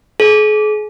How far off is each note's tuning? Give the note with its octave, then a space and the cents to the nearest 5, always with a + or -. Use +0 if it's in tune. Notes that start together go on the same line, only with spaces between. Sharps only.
G#4 +40